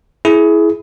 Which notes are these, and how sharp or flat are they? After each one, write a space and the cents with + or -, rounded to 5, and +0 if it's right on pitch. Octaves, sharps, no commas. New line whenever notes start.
E4 +0 G#4 +20